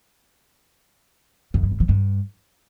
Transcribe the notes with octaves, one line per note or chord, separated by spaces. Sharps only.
F#2
G2
G#2
E3
G2